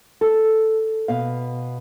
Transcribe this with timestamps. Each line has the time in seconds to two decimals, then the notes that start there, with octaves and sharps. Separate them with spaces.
0.21 A4
1.08 B2 F5